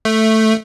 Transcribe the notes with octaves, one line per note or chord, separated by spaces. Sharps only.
A3